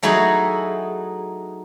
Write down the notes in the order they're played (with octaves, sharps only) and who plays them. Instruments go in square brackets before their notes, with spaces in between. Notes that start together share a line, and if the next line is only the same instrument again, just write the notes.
[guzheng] F#3 A3 D#4 E4 F#4 G#4